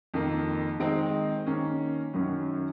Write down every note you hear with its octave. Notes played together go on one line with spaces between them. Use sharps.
F2 D#3 A#3
D#3 G#3 C4 D#4
D#3 A#3 C#4
F#2 D#3 F#3 C#4